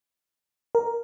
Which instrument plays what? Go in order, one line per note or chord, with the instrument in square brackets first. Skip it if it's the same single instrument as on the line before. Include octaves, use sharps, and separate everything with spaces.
[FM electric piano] A#4